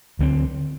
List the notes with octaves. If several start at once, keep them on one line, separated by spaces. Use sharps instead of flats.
D2 D3 F#3 C4